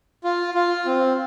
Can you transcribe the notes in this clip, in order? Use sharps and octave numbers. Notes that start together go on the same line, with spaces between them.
F4
F4
C4